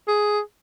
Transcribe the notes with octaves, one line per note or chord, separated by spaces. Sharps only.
G#4